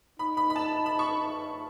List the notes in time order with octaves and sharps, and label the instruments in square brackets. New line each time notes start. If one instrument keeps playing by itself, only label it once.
[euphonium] D#4 [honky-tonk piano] B5
[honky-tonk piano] B5
B5
A5
B5
C#6